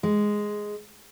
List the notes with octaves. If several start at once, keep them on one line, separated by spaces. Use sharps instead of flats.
G#3